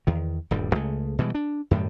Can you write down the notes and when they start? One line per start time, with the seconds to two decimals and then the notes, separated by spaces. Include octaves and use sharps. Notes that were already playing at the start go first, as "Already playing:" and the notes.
0.07 E2 D#3
0.51 D#1 D2 G2 G3
0.75 C#2 C#3 G#3 A3
1.19 B2 E3 G3 G#3
1.35 D4
1.71 F#2 A2 D#3 G3